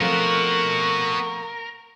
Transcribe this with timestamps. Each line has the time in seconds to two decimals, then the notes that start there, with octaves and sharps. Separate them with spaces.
0.01 F3 A3 B3 C4 F#4 A#4 C#6